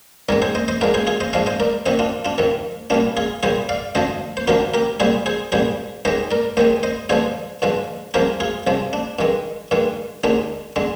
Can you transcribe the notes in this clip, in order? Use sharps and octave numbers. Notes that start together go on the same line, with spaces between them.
G#2 D#3 G#3 A#4 D5
G#4 C5
C5 D#5
C5 D#5
G#2 F3 G#3 A#4 D5
G#4 C5
F4 G#4
C5 D#5
G#2 F3 G#3 D5 F5
C5 D#5
A#4 D5
F2 C3 D#3 C5 D#5
D4 F4
D4 F4
F2 C3 D#3
C2 A#2 G3 D4 F4
F4 G#4
C2 A#2 G3 G#4 C5
D5 F5
D2 D3 F3 C5 D#5
C5
D2 D3 F3 G4 A#4
G4 A#4
C2 A#2 G3 G#4 C5
G#4 C5
C2 A#2 G3 G#4 C5
D#2 D#3 G#3 C5 D#5
A#4 D5
D#2 D#3 G#3 C5 D#5
C5 D#5
G2 D3 F3 G#3 G#4 C5
G2 D3 F3 G#3
C2 C3 F3 G#3 G4 A#4
F4 G#4
C2 C3 F3 G#3
D4
G2 D#3 G#3
G2 D#3 G#3
D#2 D3 G#3 D#4
D3 G#3